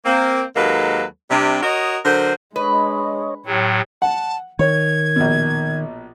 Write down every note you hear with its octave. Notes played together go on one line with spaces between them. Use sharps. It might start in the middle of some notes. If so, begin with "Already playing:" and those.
A#3 C4
D#2 F#3 G#3 A#3 A4 B4
C3 G3 D4
F#4 A#4 C#5 D#5
D3 F#3 A#4 C5
G#3 D4 B4 C#5 D#5
A2 F#3 G4 C#5
F#5 A5
D#3 C#5 G#6
A#1 B2